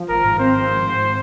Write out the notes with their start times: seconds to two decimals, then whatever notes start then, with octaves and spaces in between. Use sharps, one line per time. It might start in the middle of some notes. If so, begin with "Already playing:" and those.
Already playing: F3
0.09 G#1 A#4
0.24 G#2
0.39 C4 C5
0.55 F3
0.70 G#1
0.85 G#2